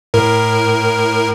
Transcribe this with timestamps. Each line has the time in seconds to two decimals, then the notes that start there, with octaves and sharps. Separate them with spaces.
0.14 A2 A#4